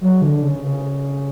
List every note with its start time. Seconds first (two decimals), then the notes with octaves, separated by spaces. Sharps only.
0.01 F#3
0.22 D3
0.42 C#3
0.62 C#3